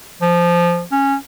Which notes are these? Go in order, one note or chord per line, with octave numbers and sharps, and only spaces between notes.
F3
C#4